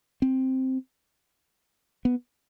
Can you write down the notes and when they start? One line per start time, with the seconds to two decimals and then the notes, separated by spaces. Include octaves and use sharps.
0.22 C4
2.05 B3